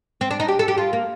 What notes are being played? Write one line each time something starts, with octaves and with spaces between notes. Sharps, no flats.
C4
D4
D#4
G4
A4
G4
F4
A#3